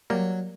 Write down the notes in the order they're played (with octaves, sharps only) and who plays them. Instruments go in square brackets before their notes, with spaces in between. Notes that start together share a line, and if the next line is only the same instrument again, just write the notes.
[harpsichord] F#3 [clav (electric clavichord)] G3 A#3